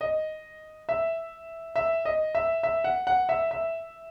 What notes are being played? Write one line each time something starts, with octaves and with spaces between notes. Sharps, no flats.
D#5
E5
E5
D#5
E5
E5
F#5
F#5
E5
E5